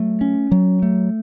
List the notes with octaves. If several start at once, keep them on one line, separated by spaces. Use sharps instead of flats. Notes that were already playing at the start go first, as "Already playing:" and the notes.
Already playing: F#3 A3
C#4
F#3
A3